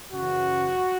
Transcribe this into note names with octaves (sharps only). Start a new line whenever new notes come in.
F#2 C#3 E3 F#4